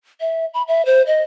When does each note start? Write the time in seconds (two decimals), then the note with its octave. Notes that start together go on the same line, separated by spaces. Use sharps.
0.20 E5
0.54 B5
0.68 E5
0.86 C5
1.07 D#5